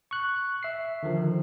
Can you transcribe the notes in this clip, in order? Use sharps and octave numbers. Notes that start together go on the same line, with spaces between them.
C#6 F#6
E5 C7
D3 D#3 F3